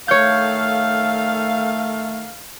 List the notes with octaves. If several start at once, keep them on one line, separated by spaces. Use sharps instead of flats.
D#3 A3 A4 C#5 F5 G6